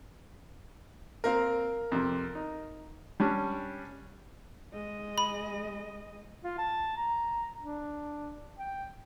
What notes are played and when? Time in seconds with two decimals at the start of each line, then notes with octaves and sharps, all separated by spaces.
1.24 A#3 C4 A#4 F5
1.92 F2 C3
2.35 D#4
3.20 G3 C#4 D4
4.73 G#3 D#5
5.18 B5
6.44 F4
6.58 A5
6.97 A#5
7.61 D4
8.58 G5